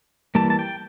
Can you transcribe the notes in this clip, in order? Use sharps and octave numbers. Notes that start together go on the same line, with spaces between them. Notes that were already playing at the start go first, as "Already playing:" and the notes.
E3 G3 A#3 A5
A5
G5